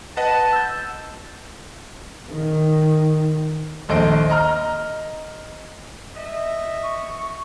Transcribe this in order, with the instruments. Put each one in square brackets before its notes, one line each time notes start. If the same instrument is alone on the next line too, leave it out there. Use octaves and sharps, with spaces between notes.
[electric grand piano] B4 D#5 F#5 [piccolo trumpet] A5
[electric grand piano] E6 G6
[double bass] D#3
[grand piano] A#1 D#2 A4 C5 D#5 D7
D#5 A#5 F6
[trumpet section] D#5 E5
[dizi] C#6